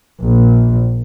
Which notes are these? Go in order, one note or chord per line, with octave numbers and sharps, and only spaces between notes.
A#1